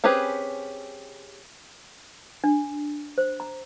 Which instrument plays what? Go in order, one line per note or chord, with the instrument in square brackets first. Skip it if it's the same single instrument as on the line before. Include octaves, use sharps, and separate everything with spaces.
[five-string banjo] C4 C#4 G4 G#4 B4
[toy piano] D4
C5
A#5